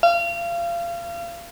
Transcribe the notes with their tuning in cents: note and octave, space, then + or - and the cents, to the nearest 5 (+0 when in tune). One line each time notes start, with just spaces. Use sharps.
F5 -30